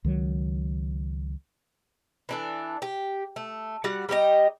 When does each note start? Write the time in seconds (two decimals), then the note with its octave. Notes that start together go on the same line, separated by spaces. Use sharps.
0.04 C#2 D#3 F#3
2.29 E3 D4 A4
2.82 G4
3.36 A3
3.84 G3 F#4 F#5
4.09 G3 D#4 G4 D#5